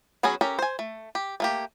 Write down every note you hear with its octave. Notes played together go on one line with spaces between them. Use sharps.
F#3 B3 C#4 F#4 G#4
C#4 G4 A4 A#4
C5 G#5
A3
G4
A3 A#3 G4